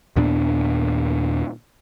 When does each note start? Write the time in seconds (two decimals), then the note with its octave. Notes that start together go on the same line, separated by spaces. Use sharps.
0.16 D#2 A#2 B3 D4